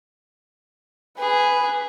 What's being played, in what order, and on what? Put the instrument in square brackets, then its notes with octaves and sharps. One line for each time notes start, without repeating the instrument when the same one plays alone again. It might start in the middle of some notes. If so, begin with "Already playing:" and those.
[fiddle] G#4 [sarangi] B4